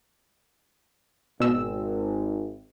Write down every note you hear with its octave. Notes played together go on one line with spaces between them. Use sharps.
G#1 B2 E6